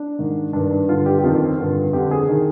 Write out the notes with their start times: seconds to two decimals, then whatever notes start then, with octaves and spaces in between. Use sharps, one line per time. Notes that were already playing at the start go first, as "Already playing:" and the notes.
Already playing: D4
0.19 G#2 D#3
0.53 G2 D#3 D4
0.71 D4
0.88 G2 D3 F4
1.06 G4
1.19 G4
1.24 F2 D#3 F4
1.58 G2 D3
1.93 F2 D3 G4
2.11 G#4
2.29 D#3